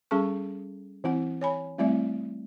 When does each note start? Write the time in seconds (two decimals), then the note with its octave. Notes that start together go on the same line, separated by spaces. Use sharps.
0.11 G3 C#4 G#4 A4 A5 C#6
1.04 E3 C4 E4 F#5
1.41 C#5 G#5 B5
1.78 G3 A3 C4 E4 D5 E5